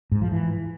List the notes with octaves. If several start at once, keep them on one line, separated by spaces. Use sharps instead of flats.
G#2
F3
E3